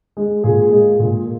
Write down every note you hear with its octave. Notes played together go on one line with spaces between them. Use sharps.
G#3
A#2 G#4
G#3
A#2